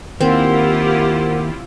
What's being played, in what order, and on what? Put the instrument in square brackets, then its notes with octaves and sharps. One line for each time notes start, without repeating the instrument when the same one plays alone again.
[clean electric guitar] D#2 [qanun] C4 [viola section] E4 F4 G4 [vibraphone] A#4 C5 F#5